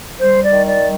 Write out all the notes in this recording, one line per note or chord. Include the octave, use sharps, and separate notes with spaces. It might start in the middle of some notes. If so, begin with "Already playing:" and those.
G3 C5
D5
D#3
D5
G3